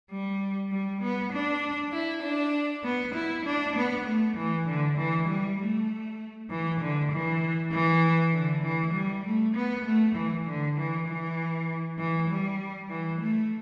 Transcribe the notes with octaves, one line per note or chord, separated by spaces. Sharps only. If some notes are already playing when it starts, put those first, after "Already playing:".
G3
G3
B3
D4
E4
D4
B3
E4
D4
B3
A3
E3
D3
E3
G3
A3
E3
D3
E3
E3
D3
E3
G3
A3
B3
A3
E3
D3
E3
E3
E3
G3
E3
A3